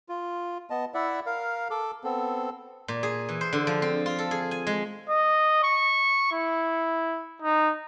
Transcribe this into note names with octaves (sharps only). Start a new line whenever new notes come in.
F4
B3 D#5 A5
E4 D5 E5 F#5
A#4 F5
A4 D6
B3 C4 A4
A#2
G#4
E3
C5
D3
F3
C4
F4
A4
G#4
G#5
G#3
D#5
C#6
E4
D#4